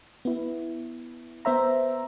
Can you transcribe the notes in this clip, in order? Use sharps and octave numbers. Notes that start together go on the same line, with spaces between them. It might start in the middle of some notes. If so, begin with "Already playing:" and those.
B3 E4
B3 C5 E5 A#5